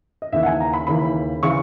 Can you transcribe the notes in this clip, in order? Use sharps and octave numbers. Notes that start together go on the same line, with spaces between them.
D#5
D#2 C#3 E3 E5
F#5
G#5
A#5
B5
D#2 C#3 E3 B5
C#3 E3 C#6